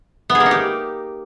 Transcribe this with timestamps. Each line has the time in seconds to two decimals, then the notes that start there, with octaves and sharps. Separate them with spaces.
0.30 B3
0.35 G#4
0.40 A#3
0.46 D#4
0.51 G4